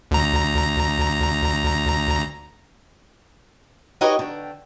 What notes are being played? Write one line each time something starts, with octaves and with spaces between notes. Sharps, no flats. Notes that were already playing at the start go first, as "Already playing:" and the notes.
D2 A#5
D#4 F#4 G4 B4 C#5 D#5
D3 G5